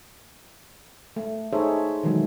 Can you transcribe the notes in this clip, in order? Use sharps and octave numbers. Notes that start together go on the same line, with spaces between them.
A3
D#4 G#4 A4 C5 C#5 E5
B2 D#3 E3 F#3 G#3 A3